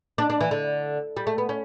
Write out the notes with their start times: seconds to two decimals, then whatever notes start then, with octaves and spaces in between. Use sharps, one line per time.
0.18 D4
0.30 D4
0.41 E3
0.51 D3
1.17 G3
1.27 A3
1.38 B3
1.49 C#4